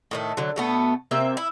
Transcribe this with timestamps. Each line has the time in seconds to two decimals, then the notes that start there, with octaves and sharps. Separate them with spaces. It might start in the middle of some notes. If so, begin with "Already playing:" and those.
0.11 A2 D#3 A3
0.37 D3 F#3
0.56 B2 A3 B3
1.11 C3 A#3 C4 E5
1.37 E4